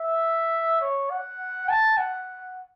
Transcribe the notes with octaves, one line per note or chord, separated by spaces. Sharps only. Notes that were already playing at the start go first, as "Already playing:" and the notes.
Already playing: E5
C#5
F#5
A5
F#5